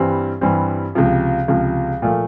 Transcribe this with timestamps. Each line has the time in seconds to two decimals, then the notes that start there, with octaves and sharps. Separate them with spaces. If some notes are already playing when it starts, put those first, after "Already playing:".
Already playing: G2 E3 G3 C4
0.41 G2 E3 G3 C4
0.95 C#2 C3 F3
1.48 C#2 C3 F3
2.02 A#2 F3 A3